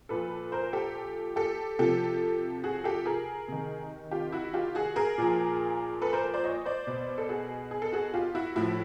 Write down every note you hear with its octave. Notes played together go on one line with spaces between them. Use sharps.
A#2 F3 A4 B4
A#4 C5
G4 A4
G4 A4
C3 F3 G4 A4
F#4 G#4
G4 A4
G#4 A#4
C3 D#3
F4 G4
E4 F#4
F4 G4
F#4 G#4
G#4 A#4
A#2 F3
A4 B4
A#4 C5
C5 D5
C#5 D#5
C5 D5
B2
A4
F#4 G#4
G#4
A4
F#4 G#4
F4 G4
E4 F#4
A2 F3 E4 F#4